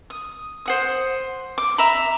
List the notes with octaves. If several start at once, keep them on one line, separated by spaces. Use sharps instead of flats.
D#6
C5 F#5 D#6
D6
E5 A#5 B5